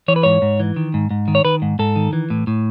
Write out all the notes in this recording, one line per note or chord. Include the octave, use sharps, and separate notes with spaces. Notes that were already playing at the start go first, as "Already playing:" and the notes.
E3 C#5
B4
G#2 C#5
G#2
E3
D#3
G#2
G#2
D#3
C#5
D#3 B4
G#2
G#2 A4
D#3
E3
A2
A2